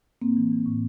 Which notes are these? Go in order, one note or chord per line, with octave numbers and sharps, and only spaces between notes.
A2 A#3 C4
E3
E3
A2